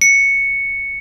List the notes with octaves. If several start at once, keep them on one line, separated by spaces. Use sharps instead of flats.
C#7